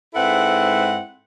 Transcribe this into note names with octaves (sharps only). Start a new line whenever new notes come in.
G#2 C4 E4 A4 B4 F#5